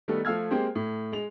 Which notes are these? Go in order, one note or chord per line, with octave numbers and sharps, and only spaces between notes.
D#3 G3 A3 B3 D#4 A4
F3 A3 F5 E6 F6 G#6
G#3 A#3 C4 G4 C5
A2
G#3 F7